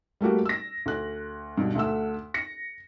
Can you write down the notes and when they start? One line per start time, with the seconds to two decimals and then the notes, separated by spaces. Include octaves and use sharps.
0.21 G3 A3 A#3 F#4 G4
0.45 E6 A#6
0.86 D2 F#6
1.58 G2 B2
1.75 D2 A3 F#5 E6
2.34 A#6 C#7